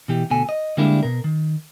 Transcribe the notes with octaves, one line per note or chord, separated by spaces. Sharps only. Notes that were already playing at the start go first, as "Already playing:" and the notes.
B2 E3 G4
D2 B2 A4 G#5
D#5
D3 G3 G#3 A#3 D4 E4
B2 A#4
D#3